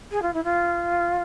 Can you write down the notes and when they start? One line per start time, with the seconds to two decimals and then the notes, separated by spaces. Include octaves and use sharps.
0.11 G#4
0.22 F4
0.33 E4
0.43 F4